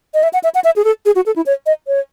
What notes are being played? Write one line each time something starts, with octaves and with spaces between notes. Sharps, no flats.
D#5
E5
F#5
E5
F#5
E5
G#4
A4
G#4
F#4
A4
E4
C#5
D#5
C#5